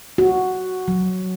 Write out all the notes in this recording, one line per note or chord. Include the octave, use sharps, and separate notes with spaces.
F#4
F#3